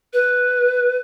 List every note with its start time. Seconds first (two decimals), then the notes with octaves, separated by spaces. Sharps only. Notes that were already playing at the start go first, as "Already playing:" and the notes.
0.13 B4